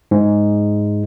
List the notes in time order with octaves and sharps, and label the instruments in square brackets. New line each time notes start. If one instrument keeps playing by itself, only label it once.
[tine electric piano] G#2